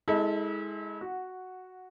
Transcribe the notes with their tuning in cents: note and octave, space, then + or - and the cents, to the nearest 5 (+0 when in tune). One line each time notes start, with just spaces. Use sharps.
G#3 +0 E4 -35 A4 +0
F#4 +0 F#5 -10